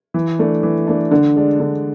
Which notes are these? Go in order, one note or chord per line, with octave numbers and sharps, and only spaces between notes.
E3
A3 D4
E3
A3 D4
D3
G#3 D4
D3